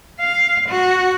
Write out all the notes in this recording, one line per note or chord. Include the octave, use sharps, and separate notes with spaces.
F5
F#4